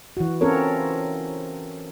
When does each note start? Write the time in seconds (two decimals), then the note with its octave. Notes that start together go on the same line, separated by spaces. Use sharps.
0.17 E3 F#4
0.41 C4 C#4 F4 A4 A#4 C#5